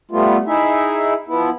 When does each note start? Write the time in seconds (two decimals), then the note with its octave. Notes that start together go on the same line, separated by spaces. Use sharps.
0.11 G3 A3 B3 F4
0.47 D#4 E4 G#4 E5
1.28 F3 B3 E4